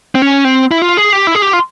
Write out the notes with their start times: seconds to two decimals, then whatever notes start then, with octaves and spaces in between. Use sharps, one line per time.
0.15 C4
0.22 C#4
0.44 C4
0.71 E4
0.82 F4
0.97 G#4
1.13 G4
1.27 E4
1.35 G#4
1.42 G4
1.53 F4